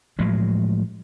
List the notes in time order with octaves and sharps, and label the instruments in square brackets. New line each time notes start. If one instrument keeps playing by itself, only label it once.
[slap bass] A2 F3 F#3 G#3